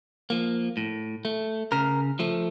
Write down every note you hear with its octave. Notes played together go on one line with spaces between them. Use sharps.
F3 A#3
A2
A3
C#3 A#4
F3 A3